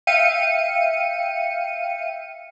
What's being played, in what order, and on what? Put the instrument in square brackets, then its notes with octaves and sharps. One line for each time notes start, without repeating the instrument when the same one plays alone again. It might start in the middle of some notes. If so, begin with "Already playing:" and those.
[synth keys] E5 F5 G5 C#7 D#7